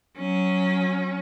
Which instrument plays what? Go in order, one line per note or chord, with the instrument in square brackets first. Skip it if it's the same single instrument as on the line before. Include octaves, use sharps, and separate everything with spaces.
[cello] F#3 C#4